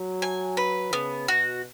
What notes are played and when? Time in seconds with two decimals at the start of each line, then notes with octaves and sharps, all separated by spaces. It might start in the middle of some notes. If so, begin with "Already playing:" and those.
Already playing: F#3
0.22 G#5
0.57 B4
0.93 C#3 B3
1.28 B2 F#4